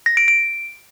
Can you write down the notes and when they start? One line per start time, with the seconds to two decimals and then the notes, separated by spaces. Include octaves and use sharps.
0.06 A#6
0.17 D7
0.28 D7